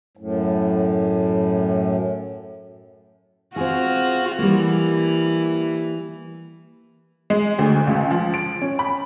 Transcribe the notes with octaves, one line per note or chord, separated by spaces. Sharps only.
F#2 A2
C4 F4 F#4 G#4
E3 G3 A#3
G#3
D2
C#2
F3
D7
C#4
B5